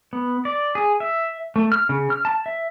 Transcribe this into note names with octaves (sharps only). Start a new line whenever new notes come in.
B3
D5
G#4
E5
A3
F6
C#3
F6
A5
E5